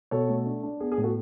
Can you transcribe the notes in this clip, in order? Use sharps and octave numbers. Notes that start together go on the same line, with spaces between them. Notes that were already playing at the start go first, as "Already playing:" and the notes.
B2 A4 C#5
A3
D4
D4
B3 G#4
G#4
A2
F#4 A4